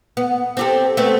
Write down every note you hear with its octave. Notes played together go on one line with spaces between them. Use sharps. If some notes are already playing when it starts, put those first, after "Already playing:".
B3
C4 G4 A4
A3 B3 C4